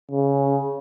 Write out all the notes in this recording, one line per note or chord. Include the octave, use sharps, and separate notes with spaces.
C#3